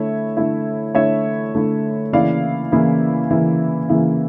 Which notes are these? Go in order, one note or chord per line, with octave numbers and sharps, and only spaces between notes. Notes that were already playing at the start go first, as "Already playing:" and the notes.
Already playing: D3 A3 E4 C#5 E5
D3 A3 E4
D3 A3 E4 C#5 E5
D3 A3 E4
C#3 E3 A#3 E4 D5 F5
C#3 E3 A#3 E4
C#3 E3 A#3 E4
C#3 E3 A#3 E4